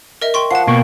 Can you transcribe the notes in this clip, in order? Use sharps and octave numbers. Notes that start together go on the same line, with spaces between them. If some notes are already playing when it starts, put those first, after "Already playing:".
A#4 D#5 E5
G5 C6 C#6
F3 F#5 A5 C7
B2 A#3 G4 C#6